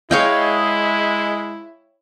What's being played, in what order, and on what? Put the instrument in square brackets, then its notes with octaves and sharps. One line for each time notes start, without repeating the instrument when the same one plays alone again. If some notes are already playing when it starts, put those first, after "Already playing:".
[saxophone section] G#3 [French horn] E4 [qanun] C#5 F5 G5